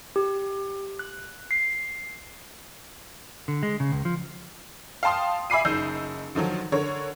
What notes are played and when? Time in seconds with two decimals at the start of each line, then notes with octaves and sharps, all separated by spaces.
0.16 G4
0.99 F#6
1.51 C7
3.48 D3
3.63 G#3
3.80 C#3
3.92 C#2
4.05 F3
5.03 F5 G5 A5 C6 D#6
5.50 E5 G#5 B5 D6 C7 D#7
5.65 F#1 D#4 E6 G6
6.35 D3 D#3 F3 F#3
6.72 D3 A#4 C#5